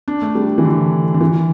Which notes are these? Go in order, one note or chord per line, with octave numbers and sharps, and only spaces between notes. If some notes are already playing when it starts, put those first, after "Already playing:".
D4
A3
G3
E3
D3
D3
E3